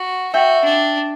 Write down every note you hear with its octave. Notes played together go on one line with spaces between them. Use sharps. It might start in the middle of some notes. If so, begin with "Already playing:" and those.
Already playing: F#4
F#4 E5 G5
D4